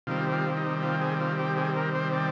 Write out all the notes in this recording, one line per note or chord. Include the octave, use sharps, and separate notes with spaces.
C3 D#3 G3 C4 F4
F4
D#4
F4
G#4
F4
G4
G#4
A#4
C5
D5